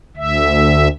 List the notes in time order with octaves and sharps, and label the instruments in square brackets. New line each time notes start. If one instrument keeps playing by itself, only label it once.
[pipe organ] D2 E5